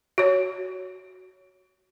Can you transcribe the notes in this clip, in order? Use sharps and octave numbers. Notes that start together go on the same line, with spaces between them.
F#4 C#5